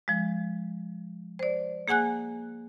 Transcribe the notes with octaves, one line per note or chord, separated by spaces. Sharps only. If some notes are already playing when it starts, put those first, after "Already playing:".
F3 G#3
C5 D5
A#3 G#4 F#5 G#5 F#6